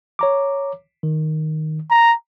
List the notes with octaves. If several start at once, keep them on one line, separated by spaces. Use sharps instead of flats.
C#5 A#5 D6
D#3
A#5